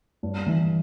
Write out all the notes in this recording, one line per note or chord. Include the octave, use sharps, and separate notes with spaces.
G2
E3